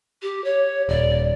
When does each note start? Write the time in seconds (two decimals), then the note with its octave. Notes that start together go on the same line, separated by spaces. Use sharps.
0.22 G4
0.44 C#5
0.89 D#1 D5